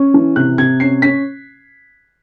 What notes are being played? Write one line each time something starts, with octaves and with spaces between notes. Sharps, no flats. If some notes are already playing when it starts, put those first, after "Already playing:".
Already playing: C#4
E3
C3 F#6
C3 G#6
C#4 C7
C#4 B6